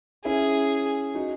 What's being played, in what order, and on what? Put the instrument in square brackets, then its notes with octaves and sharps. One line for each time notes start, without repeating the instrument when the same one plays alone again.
[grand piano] C#4 E4 [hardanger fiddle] G#4
[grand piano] D#4 F#4